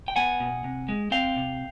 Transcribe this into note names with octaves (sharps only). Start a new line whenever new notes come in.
G5
B3 F#5 G#5
B2
C3
G#3
C4 F5 G5
C3